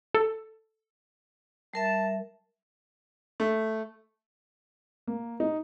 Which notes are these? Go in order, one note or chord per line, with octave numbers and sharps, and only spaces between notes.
A4
G3 A#4 E5 A5
A3
A#3
D#4